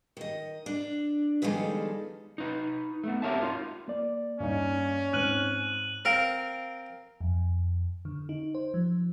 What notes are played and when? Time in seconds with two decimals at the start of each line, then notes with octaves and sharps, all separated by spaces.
0.17 D#3 D#5
0.66 D4
1.42 B2 D#3 F3 G3 G#3 A4
2.38 D#4 B4
3.04 A3 B3
3.22 G4 A#4 C#5 E5 A5
3.42 D#4 F4
3.88 A#3 D5
4.40 G2 C#4 D#4
5.13 G#2 C4 F6 F#6 D#7 F#7
6.05 C4 A#4 F5
7.21 F2
8.05 D3
8.29 D#4
8.55 C5
8.74 F3